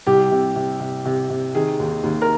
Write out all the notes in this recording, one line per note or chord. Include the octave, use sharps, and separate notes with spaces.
C2 G4
C3
C3
C3
C3
C3
D#3 G#4
D#2
D#2
A#4